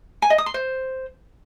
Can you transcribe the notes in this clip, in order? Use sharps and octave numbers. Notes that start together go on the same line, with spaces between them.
G#5
D#5
D#6
C6
C5